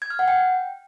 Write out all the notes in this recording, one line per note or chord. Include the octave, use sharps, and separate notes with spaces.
G#6
F6
F#5
G5